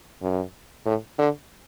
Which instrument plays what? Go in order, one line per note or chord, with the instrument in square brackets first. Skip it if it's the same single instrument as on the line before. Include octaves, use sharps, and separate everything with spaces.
[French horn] F#2
A2
D3